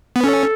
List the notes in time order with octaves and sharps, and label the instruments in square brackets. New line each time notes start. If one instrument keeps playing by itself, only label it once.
[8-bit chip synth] B3
[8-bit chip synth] C#4 [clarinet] A4